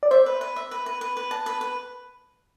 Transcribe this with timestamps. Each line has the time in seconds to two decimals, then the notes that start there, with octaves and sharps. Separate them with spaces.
0.03 D5
0.11 C5 E5
0.26 B4
0.41 B4
0.56 E5
0.71 B4
0.86 B4
1.01 B4
1.17 B4
1.31 A5
1.46 B4
1.61 B4